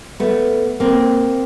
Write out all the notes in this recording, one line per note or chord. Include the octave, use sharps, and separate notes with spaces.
A3 B3
A#3 C4